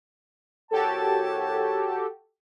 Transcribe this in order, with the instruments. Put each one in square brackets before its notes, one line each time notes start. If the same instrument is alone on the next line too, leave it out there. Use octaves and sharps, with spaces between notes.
[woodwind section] C2 C#5 A5 [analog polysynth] F#4 G4 A4